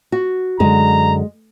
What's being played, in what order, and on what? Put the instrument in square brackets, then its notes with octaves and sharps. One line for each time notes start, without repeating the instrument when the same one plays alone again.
[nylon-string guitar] F#4
[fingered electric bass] F#2 D3 [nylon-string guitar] G#3 [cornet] A#5